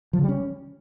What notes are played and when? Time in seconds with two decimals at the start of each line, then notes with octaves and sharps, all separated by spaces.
0.13 F3
0.18 C#3
0.23 G3
0.29 C#4